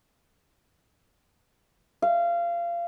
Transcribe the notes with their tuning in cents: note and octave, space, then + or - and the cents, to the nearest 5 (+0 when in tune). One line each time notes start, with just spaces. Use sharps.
F5 -25